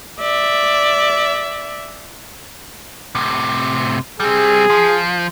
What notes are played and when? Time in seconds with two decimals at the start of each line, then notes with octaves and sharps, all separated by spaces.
0.20 D5 E5
3.15 A2 C3
4.20 G3 C4 G#4
4.70 F3